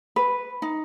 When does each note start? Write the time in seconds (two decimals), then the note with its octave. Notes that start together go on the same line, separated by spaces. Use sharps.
0.16 B4
0.62 D#4